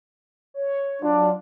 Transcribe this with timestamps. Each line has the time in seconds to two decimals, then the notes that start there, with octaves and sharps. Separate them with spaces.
0.54 C#5
1.02 F#3 D4 F4